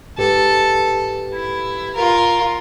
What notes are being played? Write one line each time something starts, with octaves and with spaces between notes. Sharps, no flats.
G#2 G4 A4 B4
E4
F4 A#4